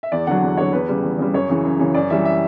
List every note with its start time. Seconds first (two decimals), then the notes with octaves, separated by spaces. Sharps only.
0.03 E5
0.12 E2 D5
0.27 D3 F#3 F#5
0.42 E2
0.57 D3 F#3 C#5
0.73 E2 B4
0.88 C#3 G3
1.03 E2
1.19 C#3 G3
1.34 F#2 C#5
1.49 C#3 E3
1.64 F#2
1.80 C#3 E3
1.94 F#2 D5
2.10 E3 G3 E5
2.25 E5